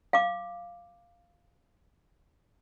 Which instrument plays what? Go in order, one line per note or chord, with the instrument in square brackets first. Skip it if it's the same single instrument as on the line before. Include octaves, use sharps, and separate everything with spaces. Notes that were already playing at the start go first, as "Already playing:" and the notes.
[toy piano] F5 D6